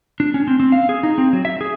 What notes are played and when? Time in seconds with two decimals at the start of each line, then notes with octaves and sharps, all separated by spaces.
0.20 D4
0.34 C#4
0.47 C4
0.60 C4
0.72 F5
0.89 G#4
1.03 D#4
1.18 C4
1.33 F#3
1.45 E5
1.61 G#4